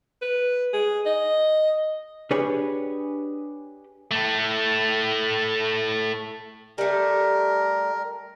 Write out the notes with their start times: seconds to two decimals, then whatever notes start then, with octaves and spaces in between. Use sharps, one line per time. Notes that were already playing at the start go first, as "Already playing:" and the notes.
0.22 B4
0.73 G#4
1.06 D#5
2.31 D4 G4 G#4 B4 C#5
4.11 A2 A3
6.78 G3 A3 A#4